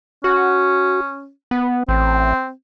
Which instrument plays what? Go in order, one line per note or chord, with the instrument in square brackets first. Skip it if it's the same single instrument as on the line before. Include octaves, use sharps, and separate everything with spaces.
[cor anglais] C#4 [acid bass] F#4
[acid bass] B3
[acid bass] A1 [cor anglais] C4